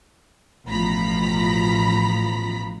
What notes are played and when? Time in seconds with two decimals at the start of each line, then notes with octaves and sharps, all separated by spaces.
0.67 A1 B2 F3 A#5 B5 B6